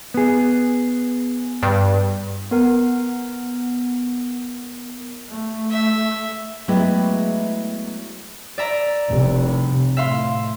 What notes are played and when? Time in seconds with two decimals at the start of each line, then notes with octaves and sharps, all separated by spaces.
0.14 B3 G#4
1.63 G2
2.51 B3 A#4 F#5
5.28 A3
5.70 E5
6.68 F#3 G#3 A3 B3 E4 G4
8.58 D5 E5 A#5
9.09 F1 C2 C3
9.97 A2 E5 F5 C6